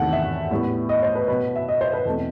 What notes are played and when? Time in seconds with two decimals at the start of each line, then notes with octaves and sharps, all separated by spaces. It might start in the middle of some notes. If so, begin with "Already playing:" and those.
Already playing: E2 C3 D#3 A3 F#5
0.13 E5
0.51 A2 G3 B3
0.89 D#5
1.03 C5
1.15 B4
1.28 B2 F#3 B3 B4
1.56 E5
1.68 D#5
1.81 C5
1.93 B4
2.05 E2 B2 A3 C4 A4